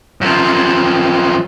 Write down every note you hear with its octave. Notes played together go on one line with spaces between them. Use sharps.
F#2 F3